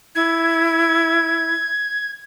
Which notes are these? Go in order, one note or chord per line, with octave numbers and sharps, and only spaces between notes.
E4 G#6